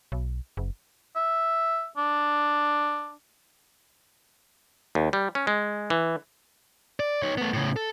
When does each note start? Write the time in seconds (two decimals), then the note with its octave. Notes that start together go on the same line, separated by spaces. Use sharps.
0.12 B1
0.57 F#1
1.16 E5
1.97 D4
4.95 D#2
5.13 G3
5.35 C#4
5.47 G#3
5.90 E3
7.00 D5
7.22 D#4 C#5
7.38 A3 B3
7.54 A2 C#3
7.76 A4